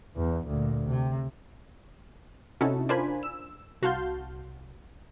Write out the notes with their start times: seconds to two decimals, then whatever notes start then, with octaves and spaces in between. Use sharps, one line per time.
0.16 E2
0.47 D2 A#2
0.86 C3
2.61 C3 C#4 D#4 E4 F#4 A4
2.89 D4 F4 A#4 C5 G#5 B5
3.23 E6
3.82 C2 F#4 F5 A5 C6 G6